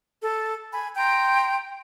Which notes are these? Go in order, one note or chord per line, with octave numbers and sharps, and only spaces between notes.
A4
G#5 B5
G5 A#5 C6 G6